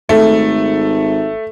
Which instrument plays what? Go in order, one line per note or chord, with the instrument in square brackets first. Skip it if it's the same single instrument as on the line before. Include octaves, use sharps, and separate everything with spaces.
[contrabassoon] G#1 [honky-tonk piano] A3